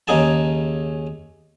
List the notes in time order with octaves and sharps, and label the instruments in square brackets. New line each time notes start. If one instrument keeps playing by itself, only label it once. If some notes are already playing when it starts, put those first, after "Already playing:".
[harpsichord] D#2 C#3 D#4 G#4 G#5 A5